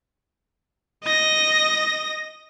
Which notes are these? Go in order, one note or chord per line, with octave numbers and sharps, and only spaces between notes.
D#5 A#6